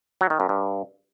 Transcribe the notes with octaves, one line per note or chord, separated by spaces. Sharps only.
F#3
D#3
F#2
G2